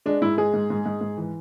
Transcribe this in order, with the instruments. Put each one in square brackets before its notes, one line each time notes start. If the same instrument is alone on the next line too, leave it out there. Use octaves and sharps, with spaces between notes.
[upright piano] G#3 D4
G#2 E4
G#3 G#4
G#2
G#2
G#2
G#2
E3